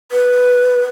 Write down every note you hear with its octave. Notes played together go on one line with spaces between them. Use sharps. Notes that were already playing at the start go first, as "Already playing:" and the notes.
B4